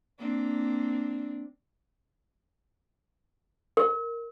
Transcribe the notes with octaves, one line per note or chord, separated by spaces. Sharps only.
A#3 C4 D4
A#4